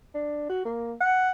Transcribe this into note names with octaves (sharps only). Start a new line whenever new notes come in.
D4
F#4
A#3
F#5